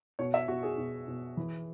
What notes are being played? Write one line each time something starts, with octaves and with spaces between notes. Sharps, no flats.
B2 C#5
E5
B2 F#4
G#4
B2
B2
E3